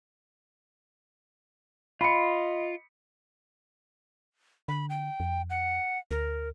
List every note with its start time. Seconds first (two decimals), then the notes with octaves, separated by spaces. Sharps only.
2.01 F4 D#5 B5 C#7
4.68 D3 B5
4.90 G5
5.20 F2
5.50 F#5
6.11 D2 A#4